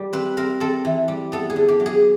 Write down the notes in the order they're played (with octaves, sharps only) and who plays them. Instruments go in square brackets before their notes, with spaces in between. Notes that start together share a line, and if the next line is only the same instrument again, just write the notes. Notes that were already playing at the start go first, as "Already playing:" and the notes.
Already playing: [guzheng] G3
C4 B4
C4 A#4
C4 A4
E3
G3
B3 A4
G#4
D3
G4
F#3
G#4